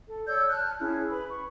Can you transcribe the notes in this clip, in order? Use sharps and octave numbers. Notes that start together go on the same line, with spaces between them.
A4
C#5 D5 E6 G6
A5 F6 F#6
C#4 E4 G#4
B4 B5
C#6